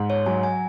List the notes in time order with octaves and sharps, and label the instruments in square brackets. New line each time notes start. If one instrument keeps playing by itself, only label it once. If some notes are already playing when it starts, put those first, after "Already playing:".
Already playing: [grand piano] G#2
[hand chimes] C#5
[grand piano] F#3 [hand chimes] G#5
[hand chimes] G#5